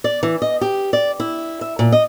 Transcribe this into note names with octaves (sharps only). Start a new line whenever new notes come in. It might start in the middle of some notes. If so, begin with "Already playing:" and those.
D5
E3
D#5
G4
D5
E4
E5
A#2
D#5